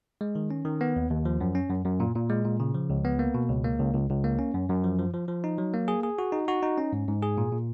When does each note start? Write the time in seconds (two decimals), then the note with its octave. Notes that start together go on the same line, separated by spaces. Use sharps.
0.21 G#3
0.35 D#3
0.51 C#4
0.65 D#3
0.81 B3
0.96 D#2
1.10 D#2
1.25 F3
1.41 F#2
1.55 C#4
1.70 F#2
1.85 F#2
2.00 A#2
2.15 A#2
2.30 G#3
2.45 A#2
2.60 C#3
2.75 F3
2.90 C#2
3.05 B3
3.19 A#3
3.34 B2
3.49 C#2
3.64 A#3
3.79 C#2
3.94 C#2
4.09 C#2
4.24 A#3
4.39 C#4
4.54 F#2
4.69 F#2
4.84 F3
4.99 F3
5.14 F3
5.28 F3
5.44 D#4
5.58 F#3
5.73 A#3
5.88 G#4
6.03 G#4
6.19 F#4
6.32 D#4
6.48 F#4
6.63 D#4
6.77 C#4
6.93 G#2
7.08 G#2
7.23 G#4
7.38 A#2
7.52 A#2